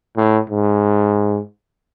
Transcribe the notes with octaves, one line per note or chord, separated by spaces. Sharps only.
A2
G#2